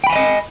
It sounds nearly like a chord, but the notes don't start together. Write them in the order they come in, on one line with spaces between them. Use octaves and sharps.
G5 B5 G#5 E5 D#5